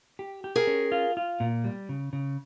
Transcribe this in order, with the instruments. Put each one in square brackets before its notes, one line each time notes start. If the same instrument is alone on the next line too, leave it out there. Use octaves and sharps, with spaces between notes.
[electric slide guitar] G4
G4
[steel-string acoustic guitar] G#4 A#4
[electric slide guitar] C#4
F4
F4
A#2
G3
C#3
C#3